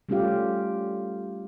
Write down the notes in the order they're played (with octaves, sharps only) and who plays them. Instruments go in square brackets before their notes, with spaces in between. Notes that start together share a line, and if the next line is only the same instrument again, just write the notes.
[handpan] G3 A3 C#4 F4 G4 F5